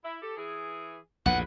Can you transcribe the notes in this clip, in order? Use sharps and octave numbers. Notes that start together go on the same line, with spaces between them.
E4
G4 A4
E3 G#4
A#1 E2 A2 B4 F#5